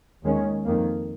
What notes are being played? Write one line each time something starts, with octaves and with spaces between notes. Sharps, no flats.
D#2 D#3 G#3 C#4
F2 D#3 A#3